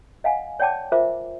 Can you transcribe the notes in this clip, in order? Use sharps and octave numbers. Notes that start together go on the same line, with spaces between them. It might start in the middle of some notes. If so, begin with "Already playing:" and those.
D#5 F5 F#5 G#5
C#5 D5 F#5 G5 A5 D6
F4 G#4 A#4 C5 E5 D6